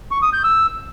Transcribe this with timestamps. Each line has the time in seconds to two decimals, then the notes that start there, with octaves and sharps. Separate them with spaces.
0.11 C#6
0.22 D#6
0.33 G6
0.44 E6